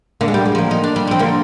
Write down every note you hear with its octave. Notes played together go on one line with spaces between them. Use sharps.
D3 A#3
G#3
G3
G#3
F3 A#3
D#4
D4
G3
F3 C4
D3 A#3